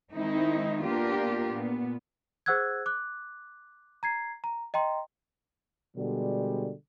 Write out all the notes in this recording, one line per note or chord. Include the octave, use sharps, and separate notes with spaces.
D#3 G#3 C4 D#4 E4
A#3 B3 D4 F4 G4 A#4
A#2 B3
G#4 C5 F#5 E6 F#6 G#6
D6 F#6
A#5 G#6 C7
A#5
D#5 G5 A#5 C6
B2 D3 G3 G#3